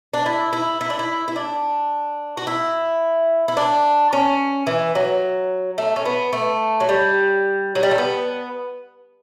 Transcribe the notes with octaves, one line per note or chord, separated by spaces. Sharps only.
D4
E4
E4
E4
D4
E4
E4
D4
F#4
E4
E4
D4
C#4
E3
F#3
A3
C#4
B3
A3
F#3
G3
F#3
G3
A3
B3